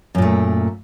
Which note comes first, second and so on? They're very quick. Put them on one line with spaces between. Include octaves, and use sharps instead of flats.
F#2 A#2 A3